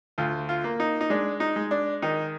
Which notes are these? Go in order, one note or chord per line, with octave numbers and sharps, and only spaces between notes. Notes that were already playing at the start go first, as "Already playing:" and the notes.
D2 F4
F4
A#3
D#4
D#4
G#3 D4
D#4
G#3
D4
D#3 D#4